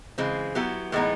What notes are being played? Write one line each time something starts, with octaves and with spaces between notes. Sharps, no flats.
C#3 E3 G#3 C4
F#3 B3 E4 G4
A2 E3 G#3 B3 D#4